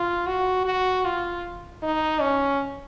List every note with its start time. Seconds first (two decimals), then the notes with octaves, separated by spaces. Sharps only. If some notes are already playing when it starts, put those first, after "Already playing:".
Already playing: F4
0.27 F#4
0.65 F#4
1.05 F4
1.83 D#4
2.21 C#4